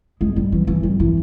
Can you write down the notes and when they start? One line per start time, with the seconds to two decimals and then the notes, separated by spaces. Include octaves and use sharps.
0.21 G#3
0.36 G3
0.52 E3
0.67 E3
0.83 G3
1.00 E3